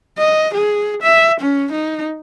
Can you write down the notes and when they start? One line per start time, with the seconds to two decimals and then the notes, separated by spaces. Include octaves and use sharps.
0.18 D#5
0.54 G#4
1.02 E5
1.40 C#4
1.72 D#4